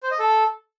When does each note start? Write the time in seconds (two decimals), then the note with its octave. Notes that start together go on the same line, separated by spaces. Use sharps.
0.03 C5
0.11 D#5
0.19 A4